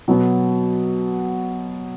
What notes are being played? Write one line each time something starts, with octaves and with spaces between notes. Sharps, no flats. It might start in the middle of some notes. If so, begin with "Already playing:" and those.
B2 F#3 B3